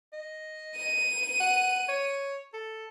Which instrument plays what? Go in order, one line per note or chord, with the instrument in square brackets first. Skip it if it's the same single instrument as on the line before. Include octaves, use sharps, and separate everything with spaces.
[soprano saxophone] D#5
[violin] D#7
[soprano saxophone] F#5
C#5
A4